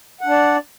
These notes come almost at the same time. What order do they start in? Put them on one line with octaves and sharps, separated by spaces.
F#5 D4 D5